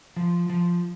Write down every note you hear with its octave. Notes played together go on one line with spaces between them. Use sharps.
F3
F3